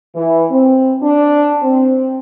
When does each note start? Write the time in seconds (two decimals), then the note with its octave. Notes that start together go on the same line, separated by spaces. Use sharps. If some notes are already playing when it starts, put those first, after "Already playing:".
0.14 E3
0.51 C4
1.02 D4
1.63 C4